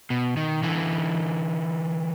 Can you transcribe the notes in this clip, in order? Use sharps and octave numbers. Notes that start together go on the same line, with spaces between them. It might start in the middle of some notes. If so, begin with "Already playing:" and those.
B2
D#3
D3 E3